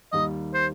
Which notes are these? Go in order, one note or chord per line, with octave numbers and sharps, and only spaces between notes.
D#2 D#3 G3 D#5
C5